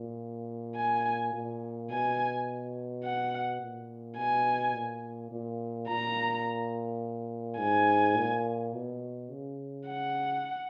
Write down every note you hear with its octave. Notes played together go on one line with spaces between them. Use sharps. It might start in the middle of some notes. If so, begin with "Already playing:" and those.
Already playing: A#2
G#5
A#2
B2 G#5
F#5
A#2
B2 G#5
A#2
A#2
A#2 A#5
G#2 G#5
A#2
B2
C#3
F#5